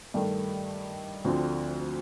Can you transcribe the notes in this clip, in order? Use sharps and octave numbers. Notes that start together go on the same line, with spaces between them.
G2 D#3 A3
D2 D3 F3 C4